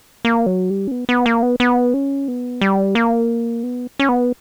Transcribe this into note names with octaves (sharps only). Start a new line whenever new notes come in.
A#3
F#3
G3
C#4
B3
B3
A#3
B3
B3
C#4
B3
G3
A#3
B3
C#4
B3